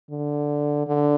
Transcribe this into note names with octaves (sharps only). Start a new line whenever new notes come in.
D3
D3